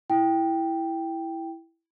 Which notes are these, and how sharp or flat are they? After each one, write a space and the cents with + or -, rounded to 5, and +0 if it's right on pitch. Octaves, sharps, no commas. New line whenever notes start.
E4 +0 G5 +0